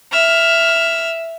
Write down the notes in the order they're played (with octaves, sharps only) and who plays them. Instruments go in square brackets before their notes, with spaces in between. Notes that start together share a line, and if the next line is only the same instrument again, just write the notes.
[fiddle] E5 F6